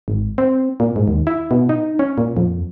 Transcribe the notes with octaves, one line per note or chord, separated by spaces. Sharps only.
G#1
C4
A#2
G#2
D#2
E4
B2
D#4
C#4
A#2
F2